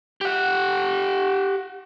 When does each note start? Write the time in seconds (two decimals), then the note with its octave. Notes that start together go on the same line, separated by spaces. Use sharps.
0.21 G4 F#5